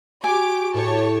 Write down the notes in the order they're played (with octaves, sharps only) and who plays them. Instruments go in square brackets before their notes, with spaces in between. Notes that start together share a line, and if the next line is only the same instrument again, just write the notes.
[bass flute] F#4 [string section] G4 D6 [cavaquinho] G#5
[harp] A2 [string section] G4 C#5 A5